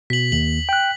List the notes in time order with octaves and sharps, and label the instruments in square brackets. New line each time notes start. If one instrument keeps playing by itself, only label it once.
[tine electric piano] B2 [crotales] B6 F#7
[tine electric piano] D#2 [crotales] F#7
[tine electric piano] G5 F#6